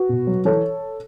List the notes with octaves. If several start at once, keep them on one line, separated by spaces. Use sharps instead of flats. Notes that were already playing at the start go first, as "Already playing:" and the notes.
Already playing: F#4 B4
B2
F#3
E3 A4 C#5